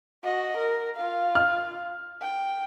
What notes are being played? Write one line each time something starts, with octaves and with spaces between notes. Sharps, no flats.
F#4 D#5
A#4
F4 F5
F6
G5